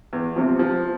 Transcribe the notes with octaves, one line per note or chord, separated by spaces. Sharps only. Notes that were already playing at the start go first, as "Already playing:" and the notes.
E2
C3 F3
F3